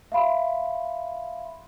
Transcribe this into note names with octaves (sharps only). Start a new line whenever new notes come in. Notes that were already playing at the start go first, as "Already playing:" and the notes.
E5 F5 B5 C6